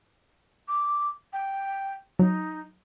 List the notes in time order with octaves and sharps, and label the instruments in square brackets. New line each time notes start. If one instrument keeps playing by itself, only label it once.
[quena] D6
G5
[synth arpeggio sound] F#3 [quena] D#4